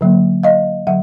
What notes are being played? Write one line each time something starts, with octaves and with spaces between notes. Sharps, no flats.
D3 F#3 A#3
D#5 F5
D3 F#3 E5 F#5